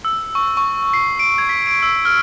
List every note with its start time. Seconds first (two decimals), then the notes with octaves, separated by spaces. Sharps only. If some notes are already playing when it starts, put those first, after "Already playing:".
0.05 E6
0.35 C#6
0.57 C#6
0.94 C7
1.19 D7
1.38 G#6
1.49 B6
1.67 D7
1.83 E6
2.05 F6